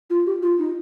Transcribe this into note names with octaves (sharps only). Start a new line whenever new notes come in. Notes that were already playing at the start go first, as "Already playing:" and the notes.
F4
G4
F4
D#4